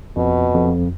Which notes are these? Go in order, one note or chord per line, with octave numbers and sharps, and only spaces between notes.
F2 B2
F2